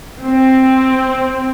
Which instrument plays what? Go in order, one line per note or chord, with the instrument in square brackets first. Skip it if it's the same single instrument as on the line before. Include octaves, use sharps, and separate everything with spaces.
[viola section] C4